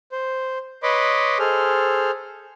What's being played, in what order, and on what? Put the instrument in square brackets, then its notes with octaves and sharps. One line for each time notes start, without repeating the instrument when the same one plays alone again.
[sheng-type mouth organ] C5
B4 C#5 D#5 B5 C6 D6
G#4 A4 C5 F6